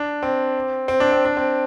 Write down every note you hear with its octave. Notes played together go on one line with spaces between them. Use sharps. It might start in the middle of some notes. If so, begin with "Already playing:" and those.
Already playing: D4
C4
C4
D4
C4
D4
C4